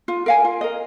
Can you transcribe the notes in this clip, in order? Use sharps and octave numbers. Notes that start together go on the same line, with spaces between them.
F4
A#4 F5 G#5
F4
A#4 D#5